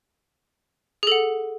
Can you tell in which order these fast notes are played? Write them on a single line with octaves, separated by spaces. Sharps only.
G#4 A4 F#5